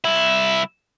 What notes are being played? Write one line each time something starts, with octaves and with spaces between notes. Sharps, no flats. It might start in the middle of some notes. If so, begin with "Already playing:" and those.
C2 E4